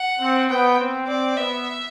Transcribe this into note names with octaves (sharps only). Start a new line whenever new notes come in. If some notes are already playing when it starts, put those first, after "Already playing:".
Already playing: F#5
C4
B3 G5
C4
C4 D5
B3 E5